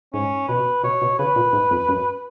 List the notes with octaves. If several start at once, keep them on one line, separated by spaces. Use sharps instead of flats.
G#2 C#4
B2 B4
B2 C#5
B2
C#3 B4
A#2
G#2
F2
F#2